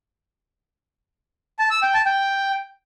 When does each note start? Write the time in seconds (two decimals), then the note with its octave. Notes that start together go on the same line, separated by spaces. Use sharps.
1.59 A5
1.71 E6
1.82 G5
1.94 A5
2.06 G5